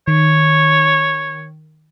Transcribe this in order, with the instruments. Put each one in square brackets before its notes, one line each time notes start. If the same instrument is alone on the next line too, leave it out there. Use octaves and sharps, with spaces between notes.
[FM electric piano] D#3 [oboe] C#5